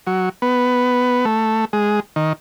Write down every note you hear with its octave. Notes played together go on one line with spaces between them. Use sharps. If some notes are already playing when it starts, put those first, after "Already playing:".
F#3
B3
A3
G#3
D#3